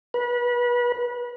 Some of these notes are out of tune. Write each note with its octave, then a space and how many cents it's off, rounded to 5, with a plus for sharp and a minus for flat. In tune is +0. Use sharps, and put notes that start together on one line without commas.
B4 -30